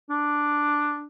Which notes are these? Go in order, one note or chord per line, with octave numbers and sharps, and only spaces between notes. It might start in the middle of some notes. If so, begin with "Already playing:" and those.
D4